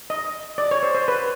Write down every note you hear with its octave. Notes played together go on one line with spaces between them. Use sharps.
D#5
D5
C#5
C5
C5
B4